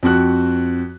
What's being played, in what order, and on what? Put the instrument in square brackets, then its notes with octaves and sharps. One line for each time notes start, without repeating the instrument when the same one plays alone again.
[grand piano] F2 C4 F#4 F#6